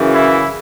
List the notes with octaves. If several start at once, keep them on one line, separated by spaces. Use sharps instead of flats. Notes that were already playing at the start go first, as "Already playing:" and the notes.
Already playing: F#2 C#3 E3
E4